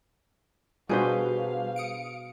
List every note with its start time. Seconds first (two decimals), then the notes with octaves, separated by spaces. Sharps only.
0.89 B2 G3 D4 F#4 G#4 B4 C5 F5
1.76 D#6 C#7 D7